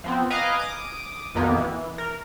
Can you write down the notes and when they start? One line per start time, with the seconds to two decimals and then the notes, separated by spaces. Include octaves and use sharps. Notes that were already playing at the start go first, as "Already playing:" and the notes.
0.04 F3 B3 C4
0.30 B4 D#5 F5 G#5 A#5 D6
0.59 D6 D#6
1.35 B1 F2 B2 D#3 A#3 B3
1.57 E3
1.98 A#4